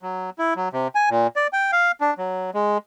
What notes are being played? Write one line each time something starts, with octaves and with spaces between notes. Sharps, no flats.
F#3
E4
F#3
C3
G#5
A#2
D5
G5
F5
D4
F#3
G#3